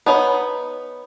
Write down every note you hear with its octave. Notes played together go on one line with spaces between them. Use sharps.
B3 D#4 C#5 E5 B5